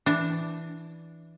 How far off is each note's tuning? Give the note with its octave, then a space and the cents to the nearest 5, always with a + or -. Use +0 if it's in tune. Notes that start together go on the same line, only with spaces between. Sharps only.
E3 +0 D4 +0